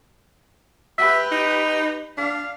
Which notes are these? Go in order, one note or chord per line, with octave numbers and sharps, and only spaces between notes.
G4 B4 E5
D#4
D4 F5